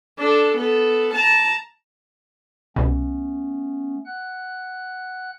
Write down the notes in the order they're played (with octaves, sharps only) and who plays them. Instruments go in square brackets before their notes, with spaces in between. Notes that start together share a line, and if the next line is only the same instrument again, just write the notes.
[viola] D4 A4
B3 A4
A5 A#5
[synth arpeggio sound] C2 B2 [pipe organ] A3 B3 C#4
[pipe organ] F#5 F#6